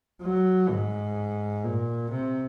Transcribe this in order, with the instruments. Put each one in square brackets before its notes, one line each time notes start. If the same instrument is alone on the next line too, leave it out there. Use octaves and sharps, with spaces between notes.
[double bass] F#3
G#2
A#2
C3